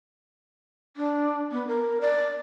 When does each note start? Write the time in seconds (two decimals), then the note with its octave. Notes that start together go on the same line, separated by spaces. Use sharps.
0.97 D4
1.52 B3
1.68 A#4
2.01 D5